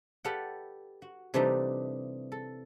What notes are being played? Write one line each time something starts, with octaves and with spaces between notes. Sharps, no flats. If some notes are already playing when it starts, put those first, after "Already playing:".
G4 A4 B4 D5 F5 F#5
F#4
C3 E3 G3 A3 D4 D#4
A4